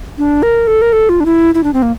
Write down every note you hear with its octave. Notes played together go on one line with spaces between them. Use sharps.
D4
A#4
A4
A#4
A4
F4
D4
E4
E4
D4
C4
A#3